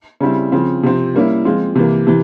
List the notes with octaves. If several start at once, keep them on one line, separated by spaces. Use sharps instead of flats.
C#3 G3 C4 E4
C#3 F3 C4
C3 F3 C4
G3 A#3 C#4 E4
F3 G#3 C4 F4
C3 E3 A#3
C3 E3